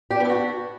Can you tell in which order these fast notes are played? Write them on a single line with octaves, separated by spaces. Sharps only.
G4 D4 B3 E4 F#4